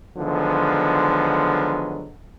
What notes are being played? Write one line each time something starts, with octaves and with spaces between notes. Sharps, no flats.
D3 D#3 F3 F#3 G#3 B3